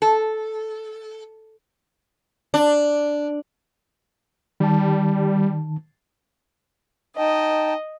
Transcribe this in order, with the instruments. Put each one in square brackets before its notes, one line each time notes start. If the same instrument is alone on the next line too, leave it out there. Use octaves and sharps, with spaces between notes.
[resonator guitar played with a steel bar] A4
[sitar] D4
[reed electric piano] D#3 A5 [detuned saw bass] G3
[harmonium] D#4 G5 A5 [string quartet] D#5